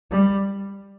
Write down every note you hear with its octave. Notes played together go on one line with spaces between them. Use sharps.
G3